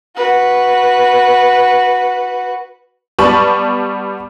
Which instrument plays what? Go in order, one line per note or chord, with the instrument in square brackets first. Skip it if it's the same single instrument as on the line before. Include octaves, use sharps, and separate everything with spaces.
[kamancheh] F#4 B4
[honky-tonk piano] G3 B3 A5 B5 C#6